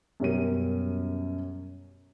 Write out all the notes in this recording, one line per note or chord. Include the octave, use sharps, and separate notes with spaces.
F#2 B2 G3 C#4 A#4 D#7